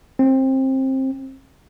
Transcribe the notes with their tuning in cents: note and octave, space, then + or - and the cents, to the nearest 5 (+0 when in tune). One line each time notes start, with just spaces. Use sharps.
C4 +20